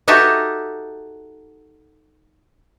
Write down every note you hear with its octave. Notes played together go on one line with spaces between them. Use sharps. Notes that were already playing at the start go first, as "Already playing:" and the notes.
D#4 F#4 G4 A4 D#5 E5